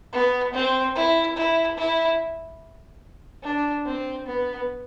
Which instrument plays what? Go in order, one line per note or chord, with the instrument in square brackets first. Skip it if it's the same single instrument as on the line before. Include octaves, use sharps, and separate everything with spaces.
[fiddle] B3
C4
E4
E4
E4
D4
C4
B3